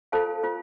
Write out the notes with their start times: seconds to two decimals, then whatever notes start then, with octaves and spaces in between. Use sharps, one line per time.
0.12 F4 A4 C5 F5 A5
0.43 F4 C5